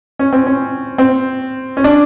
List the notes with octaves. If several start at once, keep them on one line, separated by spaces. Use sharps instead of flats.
C#4
C4
C#4
C4
C#4
D4